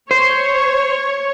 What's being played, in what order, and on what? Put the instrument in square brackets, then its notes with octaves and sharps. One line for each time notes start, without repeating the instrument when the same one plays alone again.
[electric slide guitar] C5 [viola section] C#5